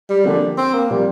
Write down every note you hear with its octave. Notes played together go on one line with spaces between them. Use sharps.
G3
D3 F3 A#3 D4 G4
C4
A#3
A#2 F3 G3 C4